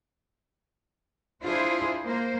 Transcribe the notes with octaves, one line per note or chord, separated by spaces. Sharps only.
D4 E4 F4 G#4 C5
A#3 C5